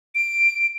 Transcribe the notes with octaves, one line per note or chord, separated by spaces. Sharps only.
D7